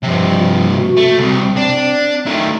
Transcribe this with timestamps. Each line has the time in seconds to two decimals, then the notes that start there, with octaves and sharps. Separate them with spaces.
0.03 G2 C3 F3
0.76 F#4
0.97 A3
1.18 C2 C4
1.56 D4
2.26 D#3 A3